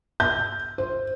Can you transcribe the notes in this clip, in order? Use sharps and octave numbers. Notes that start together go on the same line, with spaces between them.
G6
C5